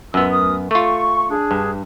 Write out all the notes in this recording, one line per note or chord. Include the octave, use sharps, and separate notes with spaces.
C#2 F#2 B3 F4 E6
D2 A#4 D#6
A3 F4 C#6
D4 G#4
G2